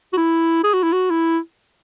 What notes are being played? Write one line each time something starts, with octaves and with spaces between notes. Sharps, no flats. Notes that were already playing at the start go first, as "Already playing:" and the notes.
F#4
E4
G#4
F#4
E4
F#4
E4